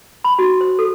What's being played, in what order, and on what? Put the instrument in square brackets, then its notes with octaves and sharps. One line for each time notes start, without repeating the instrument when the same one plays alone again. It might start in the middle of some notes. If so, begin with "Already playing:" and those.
[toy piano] B5
F#4
C5
A4